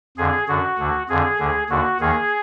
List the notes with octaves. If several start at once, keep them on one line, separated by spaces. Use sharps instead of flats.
F2 D3 G#4
F#2 D3 F#4
D2 D3
F2 D3 G#4
D2 D3
D#2 D3 F#4
D#2 D#3 G#4